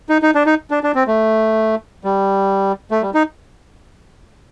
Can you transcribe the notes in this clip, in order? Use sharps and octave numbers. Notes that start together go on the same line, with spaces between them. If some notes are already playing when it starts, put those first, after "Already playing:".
D#4
D#4
D4
D#4
D4
D4
C4
A3
G3
A3
G3
D#4